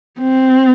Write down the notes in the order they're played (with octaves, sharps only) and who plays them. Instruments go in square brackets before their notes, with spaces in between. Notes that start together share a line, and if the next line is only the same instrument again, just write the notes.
[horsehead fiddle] C4